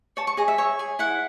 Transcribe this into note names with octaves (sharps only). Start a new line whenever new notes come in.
C#5 A5
C#6
G#4 D#5
E5
C#5
G#4
E4 F#5